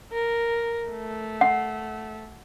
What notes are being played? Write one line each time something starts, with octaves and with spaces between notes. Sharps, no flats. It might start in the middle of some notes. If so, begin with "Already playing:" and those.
A#4
A3
F#5